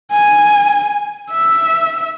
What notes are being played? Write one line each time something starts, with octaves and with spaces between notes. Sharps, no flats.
G#5
E5